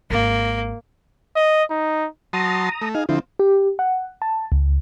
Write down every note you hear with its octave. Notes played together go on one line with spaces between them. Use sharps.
G#1 A#3
D#5
D#4
F#3 A5 A#5 C6 D#6
A3
D#4 G#4 F5
D3 F3 C4 E4
G4
F#5
A5
C#2